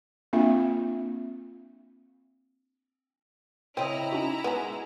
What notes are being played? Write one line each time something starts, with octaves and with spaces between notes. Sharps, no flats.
A#3 C4 D4 F4 E5
C#3 C4 E4 D#5 G5 A#5 D#6
C#4 D#4 F#4
G#3 B3 G#4